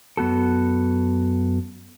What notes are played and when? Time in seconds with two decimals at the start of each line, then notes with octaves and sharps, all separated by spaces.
0.17 F#2 B3 F#4 A4